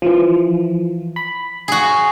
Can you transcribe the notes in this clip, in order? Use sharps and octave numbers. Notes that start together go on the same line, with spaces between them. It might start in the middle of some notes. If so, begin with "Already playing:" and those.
E3 F3
B5
F#4 G#4